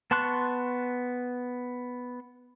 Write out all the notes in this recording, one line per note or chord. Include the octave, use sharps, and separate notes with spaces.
B3 A5 C6 C#6 F#6